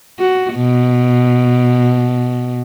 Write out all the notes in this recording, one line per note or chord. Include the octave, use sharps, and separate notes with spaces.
F#4
B2